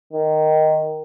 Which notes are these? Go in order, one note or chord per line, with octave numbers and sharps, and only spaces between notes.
D#3